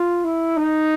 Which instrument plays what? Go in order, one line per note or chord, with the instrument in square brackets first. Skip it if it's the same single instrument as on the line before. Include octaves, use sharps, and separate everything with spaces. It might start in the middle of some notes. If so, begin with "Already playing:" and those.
Already playing: [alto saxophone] F4
E4
D#4